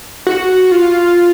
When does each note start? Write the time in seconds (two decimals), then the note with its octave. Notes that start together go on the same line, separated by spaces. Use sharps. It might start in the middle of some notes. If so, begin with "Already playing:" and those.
0.27 F#4
0.71 F4